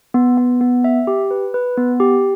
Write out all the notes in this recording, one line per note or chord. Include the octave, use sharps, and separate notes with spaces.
B3
B3
B3
E5
G4
B4
B4
B3
G4